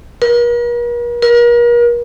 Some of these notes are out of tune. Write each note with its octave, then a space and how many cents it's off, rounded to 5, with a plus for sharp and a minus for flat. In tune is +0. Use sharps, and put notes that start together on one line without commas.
A#4 +45
A#4 +40